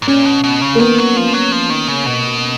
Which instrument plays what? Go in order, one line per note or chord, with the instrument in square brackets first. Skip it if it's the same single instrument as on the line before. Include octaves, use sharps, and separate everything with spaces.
[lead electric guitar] G#2
[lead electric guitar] A#2 [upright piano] C#4
[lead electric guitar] B2
B2
C#3
[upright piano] A#3
[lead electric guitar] D#3 [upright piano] B3
[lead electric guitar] F#3
F3
F#3
F3
D#3
C#3
B2